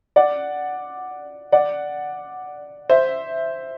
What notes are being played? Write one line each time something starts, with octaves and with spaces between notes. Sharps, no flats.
D5 F#5
D5 F#5
C5 E5